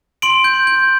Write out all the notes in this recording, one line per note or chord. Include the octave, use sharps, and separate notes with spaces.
C6 D7 F#7
G6
G6